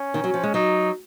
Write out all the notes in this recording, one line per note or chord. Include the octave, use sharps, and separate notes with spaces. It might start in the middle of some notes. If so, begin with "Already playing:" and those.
Already playing: C#4
D#3
F#3
F3
G#3
F#3 D#4